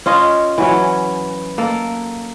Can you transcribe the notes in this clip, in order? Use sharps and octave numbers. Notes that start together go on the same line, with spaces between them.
C#4 F4 D#5
E3 F#3 C#4
A#3 A4